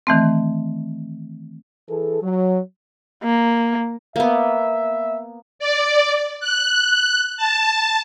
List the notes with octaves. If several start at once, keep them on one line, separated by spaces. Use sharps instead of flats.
D#3 E3 A3 C4
E3 G#4 A4
F#3
A#3
A#3 B3 E5
D5
F#6
A5